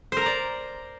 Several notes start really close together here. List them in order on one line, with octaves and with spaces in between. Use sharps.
C5 A#4 A#5 D5